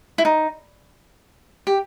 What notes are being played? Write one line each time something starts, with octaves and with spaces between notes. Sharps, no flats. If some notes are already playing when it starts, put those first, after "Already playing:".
E4
D#4
G4